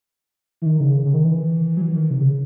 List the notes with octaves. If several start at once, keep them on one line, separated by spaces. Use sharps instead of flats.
E3
D#3
C#3
C#3
D#3
E3
F#3
E3
D#3
C3
C#3